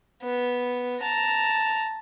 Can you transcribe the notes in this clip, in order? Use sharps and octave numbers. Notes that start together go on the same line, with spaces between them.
B3
A5 A#5